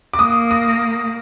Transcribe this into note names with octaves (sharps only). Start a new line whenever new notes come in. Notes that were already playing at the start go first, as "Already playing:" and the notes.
D6
A#3 D#6
D#6